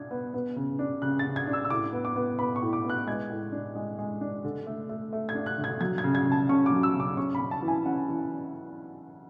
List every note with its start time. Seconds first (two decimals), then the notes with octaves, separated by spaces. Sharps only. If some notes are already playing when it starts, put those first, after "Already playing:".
Already playing: D4 G#6
0.11 B3
0.34 B3
0.56 C#3
0.79 D4
1.02 C#3 F#6
1.19 A6
1.26 C#3
1.36 G#6
1.47 D4
1.53 E6
1.65 E6
1.70 A2 D6
1.93 B3
2.05 D6
2.16 B3
2.38 B3 B5
2.56 C#6
2.62 A2
2.73 D6
2.85 B3 F#6
3.07 G#3 G#6
3.30 A2
3.52 D4
3.75 G#3
3.99 G#3
4.21 D4
4.44 D3
4.67 A3
4.89 A3
5.13 A3
5.29 G#6
5.35 D4
5.46 F#6
5.58 D3
5.64 G#6
5.81 F#3 G#6
5.98 G#6
6.04 C#3
6.15 G#6
6.26 C#3
6.32 A5
6.49 C#4 C#6
6.66 D6
6.71 F#3
6.83 E6
6.95 C#3
7.00 D6
7.17 C#4 C#6
7.35 C#4 B5
7.51 A5
7.62 E3
7.68 G#5
7.86 C#4 F#5
8.08 E3